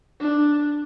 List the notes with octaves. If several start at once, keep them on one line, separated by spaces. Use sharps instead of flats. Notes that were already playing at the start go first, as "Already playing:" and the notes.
D4